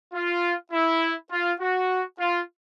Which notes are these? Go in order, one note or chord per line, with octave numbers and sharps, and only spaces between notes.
F4
E4
F4
F#4
F4